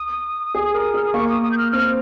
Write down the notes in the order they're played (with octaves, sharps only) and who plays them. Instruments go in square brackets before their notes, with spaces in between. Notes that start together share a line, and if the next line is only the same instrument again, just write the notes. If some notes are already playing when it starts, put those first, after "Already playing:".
Already playing: [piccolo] D#6
[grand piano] G#4
A#4
[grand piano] G#4 [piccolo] F6
[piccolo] D#6
[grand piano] A#3 [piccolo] C#6
[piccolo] D#6
D#6
G6
F6
[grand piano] C4 [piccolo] F6